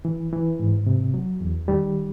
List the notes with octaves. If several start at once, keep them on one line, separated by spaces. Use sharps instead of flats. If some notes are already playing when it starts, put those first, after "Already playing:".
E3
E3
G#2
C3
F#3
E2
D#3 G3